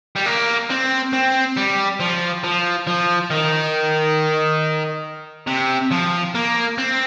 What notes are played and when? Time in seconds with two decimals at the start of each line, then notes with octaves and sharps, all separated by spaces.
0.16 G3
0.26 A#3
0.70 C4
1.13 C4
1.57 G3
2.00 F3
2.44 F3
2.87 F3
3.30 D#3
5.47 C3
5.91 F3
6.35 A#3
6.78 C4